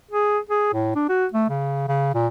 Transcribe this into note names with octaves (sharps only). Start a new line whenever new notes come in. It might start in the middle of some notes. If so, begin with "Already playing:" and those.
G#4
G#4
A2
D4
F#4
A3
C#3
C#3
A#2